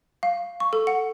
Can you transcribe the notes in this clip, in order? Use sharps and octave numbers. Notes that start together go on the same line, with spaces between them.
F5
C#6
A4
F#5